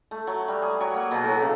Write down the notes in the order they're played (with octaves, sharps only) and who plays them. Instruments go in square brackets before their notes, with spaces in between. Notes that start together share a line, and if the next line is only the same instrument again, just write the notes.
[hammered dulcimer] A3
F#3
G3
G#4
F#3
A#3
B2
A2
C#3